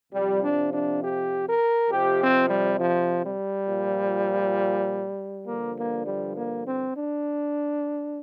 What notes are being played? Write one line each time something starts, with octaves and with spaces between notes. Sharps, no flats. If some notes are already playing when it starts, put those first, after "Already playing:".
F2 C3 F3 G3
D4
D4
G4
A#4
F2 C3 F3 G4
C4
G3
F3
G3
A#2 F3
G2 D3 F3 A#3
A#3
G3
A#3
C4
D4